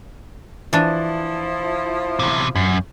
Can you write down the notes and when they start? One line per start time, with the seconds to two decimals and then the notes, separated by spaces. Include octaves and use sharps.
0.73 E3 F3 D4 E4
2.19 E2 C3
2.55 F#2